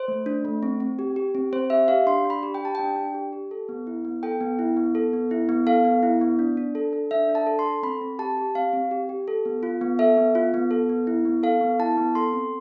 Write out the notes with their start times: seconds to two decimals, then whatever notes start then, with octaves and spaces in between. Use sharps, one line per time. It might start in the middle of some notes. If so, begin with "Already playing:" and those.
Already playing: C5
0.08 A3
0.26 D4
0.45 A3
0.63 C4
0.80 C4
0.99 G4
1.16 G4
1.35 C4
1.52 C4 C5
1.70 G4 E5
1.88 G4 F5
2.07 D4 C6
2.25 D4
2.30 B5
2.43 G4
2.54 G5
2.61 G4 A5
2.75 D4 G5
2.96 D4
3.14 G4
3.32 G4
3.51 A4
3.69 B3
3.87 E4
4.05 B3
4.23 A4 G5
4.41 B3
4.59 E4
4.77 B3
4.95 A4
5.13 B3
5.31 E4
5.49 B3
5.67 A4 F5
5.85 B3
6.03 E4
6.21 B3
6.39 D4
6.57 D4
6.75 A4
6.93 A4
7.11 D4 E5
7.29 D4
7.35 A5
7.47 A4
7.59 C6
7.65 A4
7.83 C4 B5
8.01 C4
8.19 G4 A5
8.37 G4
8.55 C4 F5
8.73 C4
8.91 G4
9.09 G4
9.28 A4
9.45 B3
9.63 F4
9.81 B3
9.99 A4 E5
10.18 B3
10.35 F4
10.54 B3
10.71 A4
10.89 B3
11.07 E4
11.25 B3
11.43 A4 F5
11.61 B3
11.79 E4 A5
11.97 B3
12.15 A4 C6
12.33 C4